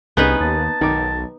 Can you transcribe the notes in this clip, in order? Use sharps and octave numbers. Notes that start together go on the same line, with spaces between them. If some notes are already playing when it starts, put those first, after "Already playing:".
C2 B3 C#4 D#4 G#4 B4
D#2 A5
B1 D#3 D6